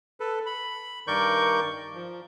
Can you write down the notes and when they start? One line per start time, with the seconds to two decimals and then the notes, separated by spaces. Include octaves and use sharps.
0.20 A4 B4
0.46 B5
1.07 G2 D#3 A#4 D5 C#6 G6
1.95 F3